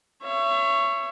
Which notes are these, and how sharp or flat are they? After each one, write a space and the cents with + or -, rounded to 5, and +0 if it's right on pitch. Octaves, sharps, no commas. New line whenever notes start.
C#5 +0 E5 +35